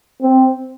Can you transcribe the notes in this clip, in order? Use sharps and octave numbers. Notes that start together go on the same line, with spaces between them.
C4